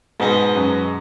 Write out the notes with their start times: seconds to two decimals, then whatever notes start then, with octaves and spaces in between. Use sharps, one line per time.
0.20 G#2 B2 G#3 D#4
0.55 F#2